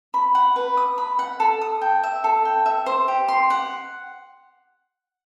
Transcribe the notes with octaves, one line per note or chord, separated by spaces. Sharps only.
B5
F#5
B4
D#6
B5
F#5
A4
D#6
G5
E5
A4
G5
E5
C5
G4
C6
F#5